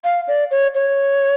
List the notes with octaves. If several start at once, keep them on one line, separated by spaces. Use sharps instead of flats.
F5
D5
C#5
C#5